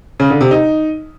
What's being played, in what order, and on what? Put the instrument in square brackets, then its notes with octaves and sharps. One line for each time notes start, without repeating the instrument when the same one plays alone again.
[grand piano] C#3
D3
C3
D#4